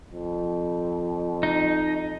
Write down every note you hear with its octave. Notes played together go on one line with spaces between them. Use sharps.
F2
D#4